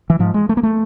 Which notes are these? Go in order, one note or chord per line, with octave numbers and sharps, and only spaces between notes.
E3
G#2 F3
G#3
A3
A#3
A3